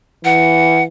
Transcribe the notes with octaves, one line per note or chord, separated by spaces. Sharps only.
E3 F#5